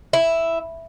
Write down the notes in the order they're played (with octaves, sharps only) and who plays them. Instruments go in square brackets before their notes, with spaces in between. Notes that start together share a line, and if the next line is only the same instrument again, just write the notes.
[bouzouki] E4